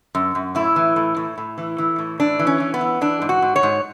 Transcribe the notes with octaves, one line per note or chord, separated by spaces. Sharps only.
F#2
F#2
A2 E4
E3
A2
A2
A2
E3
E3
A2
E3 D4
E3
C#4
E3
B3
E3
E3 D4
G#2
F#4
G#2
C#5
G#2